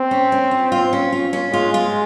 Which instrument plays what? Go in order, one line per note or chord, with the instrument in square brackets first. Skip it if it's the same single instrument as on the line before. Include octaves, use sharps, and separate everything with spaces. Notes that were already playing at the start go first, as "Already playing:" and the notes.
Already playing: [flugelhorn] C4
[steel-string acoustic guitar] C#4
C#4
F4
F4
C#4
F4
C#4
[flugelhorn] G#3 [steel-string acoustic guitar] F4
[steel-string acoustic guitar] F4